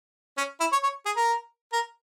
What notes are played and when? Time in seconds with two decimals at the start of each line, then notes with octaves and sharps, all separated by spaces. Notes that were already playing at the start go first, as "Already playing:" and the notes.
0.38 C#4
0.60 E4
0.72 C#5
0.83 C#5
1.06 G#4
1.16 A#4
1.73 A#4